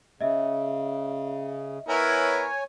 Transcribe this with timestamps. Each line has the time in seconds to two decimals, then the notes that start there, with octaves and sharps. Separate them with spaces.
0.21 C#3 D#5 E5
1.89 B3 E4 A#4 C#5 G#5